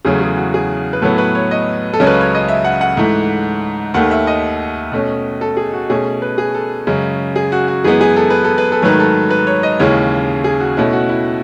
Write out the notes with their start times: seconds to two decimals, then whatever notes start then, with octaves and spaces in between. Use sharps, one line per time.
0.05 E2 C#3 F#3 A3 G#4
0.21 G#4
0.37 F#4
0.54 G#4
0.93 B4
1.02 A2 F#3 B3 A4
1.18 B4
1.35 C#5
1.51 D#5
1.93 A4
2.00 C#2 C#3 F#3 C#4
2.07 B4
2.21 C#5
2.35 D#5
2.48 E5
2.64 F#5
2.81 F#5
2.97 G#2 E3 A3
3.94 D#2 D#3 A3 F#5
4.11 E5
4.27 D#5
4.92 B2 A3 C#4
5.41 A4
5.57 G#4
5.73 F#4
5.89 B2 A3 C#4 G#4
6.22 B4
6.38 G#4
6.54 A4
6.87 F#2 C#3 G#3 C#4
7.36 G#4
7.52 F#4
7.68 F#4
7.84 F#2 E3 G#3 B3 G#4
8.01 G#4
8.16 A4
8.30 B4
8.44 A4
8.58 B4
8.72 A4
8.82 G#2 D#3 F#3 A3 B4
9.00 A4
9.30 B4
9.47 C#5
9.63 D#5
9.79 D#2 C#3 E3 G#3 C#4 C#5
10.44 G#4
10.60 F#4
10.77 B2 A3 C#4 E4
10.93 F#4
11.09 E4